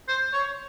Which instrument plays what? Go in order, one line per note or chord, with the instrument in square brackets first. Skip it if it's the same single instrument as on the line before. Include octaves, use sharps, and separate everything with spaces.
[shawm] C5
C#5